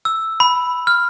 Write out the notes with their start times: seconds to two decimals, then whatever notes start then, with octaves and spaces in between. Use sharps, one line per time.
0.05 E6
0.40 B5
0.87 F6